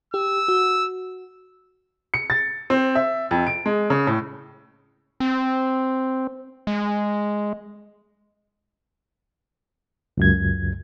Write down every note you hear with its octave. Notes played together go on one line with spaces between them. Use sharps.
G4 E6
F#4
C#7
A6
C4
E5
F2
D7
G#3
C#3
A2
C4
G#3
C#2 F#2 G#6